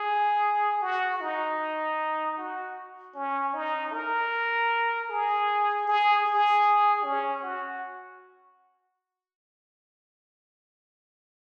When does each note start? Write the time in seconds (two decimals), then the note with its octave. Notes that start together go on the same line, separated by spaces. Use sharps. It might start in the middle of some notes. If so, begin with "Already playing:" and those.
Already playing: G#4
0.82 F#4
1.21 D#4
2.37 F#4
3.15 C#4
3.54 D#4
3.93 A#4
5.10 G#4
5.87 G#4
6.26 G#4
7.04 C#4
7.42 F#4